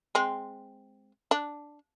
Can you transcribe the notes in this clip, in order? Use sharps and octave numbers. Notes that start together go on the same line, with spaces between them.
G#3 C4
D4